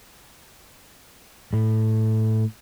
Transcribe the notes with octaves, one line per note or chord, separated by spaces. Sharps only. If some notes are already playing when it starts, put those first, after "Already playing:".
A2